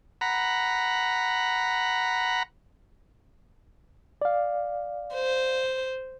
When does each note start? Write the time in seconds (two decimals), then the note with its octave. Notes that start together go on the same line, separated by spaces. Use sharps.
0.21 F#5 A#5 B5
4.22 D5 F5
5.14 C5